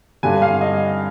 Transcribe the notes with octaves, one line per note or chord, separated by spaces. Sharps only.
G2 D3 G3 G#5
F5
D#5